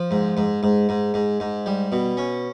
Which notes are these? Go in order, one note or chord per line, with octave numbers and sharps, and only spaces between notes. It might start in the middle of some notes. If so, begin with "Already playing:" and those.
Already playing: F3
G#2
G#2
G#2
G#2
G#2
G#2
G3
B2
C#4